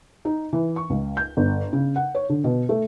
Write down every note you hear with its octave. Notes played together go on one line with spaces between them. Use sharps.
D#4
E3
C#6
C#2
G6
G1
C#3
F#5
C#5
D3
B2
A3